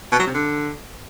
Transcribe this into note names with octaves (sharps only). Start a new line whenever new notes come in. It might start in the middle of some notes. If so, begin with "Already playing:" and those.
B2
F#3
C3
D3